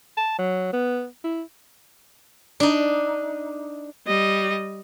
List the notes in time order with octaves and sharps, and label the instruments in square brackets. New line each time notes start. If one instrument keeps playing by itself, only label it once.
[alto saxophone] A5
F#3
B3
E4
[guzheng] D4 D#4
[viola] G3 D#5